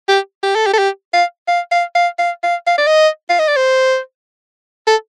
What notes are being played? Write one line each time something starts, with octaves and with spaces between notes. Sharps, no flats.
G4
G4
A4
G4
A4
G4
F5
F5
F5
F5
F5
F5
F5
D5
D#5
F5
D#5
D5
C5
A4